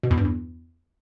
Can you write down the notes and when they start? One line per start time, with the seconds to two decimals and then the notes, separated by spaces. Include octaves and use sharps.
0.03 B2
0.11 E2
0.18 G2
0.25 E2